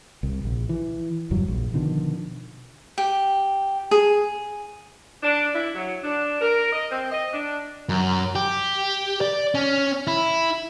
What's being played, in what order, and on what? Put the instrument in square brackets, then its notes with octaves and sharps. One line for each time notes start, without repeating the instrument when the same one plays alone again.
[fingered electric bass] C2
A#1
E3
F#1 E2 G2 F#3
A#1
B2 D3 D#3 F3
[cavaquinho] G4
G#4
[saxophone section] D4
E4
F#3
D4
A#4
D#5
C4
D#5
D4
[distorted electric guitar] F#2
G4
D5
C#4
E4